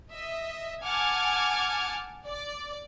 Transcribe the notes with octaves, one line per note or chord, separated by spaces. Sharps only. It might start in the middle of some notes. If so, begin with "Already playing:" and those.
D#5 E5
F#5 G#5 A5 D6 F6 G#6
D5